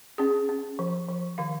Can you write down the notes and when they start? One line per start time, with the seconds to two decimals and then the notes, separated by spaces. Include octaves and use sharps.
0.18 C#4 G#4
0.49 C#4
0.79 F3
1.09 F3
1.38 D#3 F5